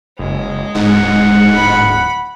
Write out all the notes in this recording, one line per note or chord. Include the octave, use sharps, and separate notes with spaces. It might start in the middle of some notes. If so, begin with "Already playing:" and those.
F#1 G#3
D1 G#2 F#5
B5